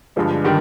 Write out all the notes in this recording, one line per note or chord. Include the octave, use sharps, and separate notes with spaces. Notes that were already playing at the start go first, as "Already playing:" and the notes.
G2 D3 F3 G#3 D4
D3 D#3 G3